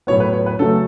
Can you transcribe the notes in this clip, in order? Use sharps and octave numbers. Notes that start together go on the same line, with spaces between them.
A2 F#3 B3 C#5
B4
C#5
B4
C#3 F#3 A3 A4